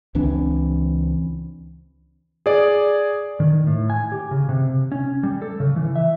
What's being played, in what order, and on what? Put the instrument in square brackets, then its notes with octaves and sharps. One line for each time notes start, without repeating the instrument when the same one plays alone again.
[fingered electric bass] C#2 E3 C4 D4
[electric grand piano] G#4 D5
[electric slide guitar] D#3
A2
G#5
G4
C#3
C3
C#4
G3
A4
C#3
E3
E5